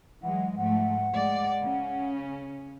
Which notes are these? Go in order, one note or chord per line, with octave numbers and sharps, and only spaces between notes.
E3 F#3 G#3 F#5
G#2 F3 A3 F#5
G#3 D5
C#3 C#4